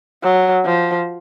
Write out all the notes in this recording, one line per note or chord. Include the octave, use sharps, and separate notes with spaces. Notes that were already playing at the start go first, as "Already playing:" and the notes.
F#3
F3